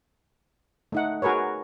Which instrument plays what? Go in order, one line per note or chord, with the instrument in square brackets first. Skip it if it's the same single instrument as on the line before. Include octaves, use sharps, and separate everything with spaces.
[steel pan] A3 D#4 F#5
F#4 G#4 A#4 B4 C#5